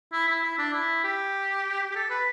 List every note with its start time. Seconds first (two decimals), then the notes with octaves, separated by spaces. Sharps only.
0.13 E4
0.28 E4
0.43 E4
0.58 D4
0.73 E4
1.04 G4
1.91 G4
1.96 A4
2.10 B4